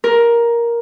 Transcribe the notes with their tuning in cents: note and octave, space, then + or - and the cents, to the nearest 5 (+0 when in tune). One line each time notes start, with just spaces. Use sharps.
A#4 +10